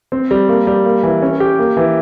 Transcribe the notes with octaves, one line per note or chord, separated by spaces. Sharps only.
C4
G3
A#3
G3
A#3
E3
C#4
G4
A#3
E3